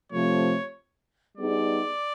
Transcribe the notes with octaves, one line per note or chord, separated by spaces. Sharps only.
C3 F3 A3 C#5
G3 B3 D#4 G#4 D5